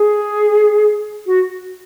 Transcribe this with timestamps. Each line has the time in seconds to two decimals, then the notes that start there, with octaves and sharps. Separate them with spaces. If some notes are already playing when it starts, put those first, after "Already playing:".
Already playing: G#4
1.26 F#4